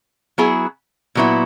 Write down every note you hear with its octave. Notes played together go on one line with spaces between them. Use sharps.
F#3 B3 E4 G#4
A#2 F#3 B3 E4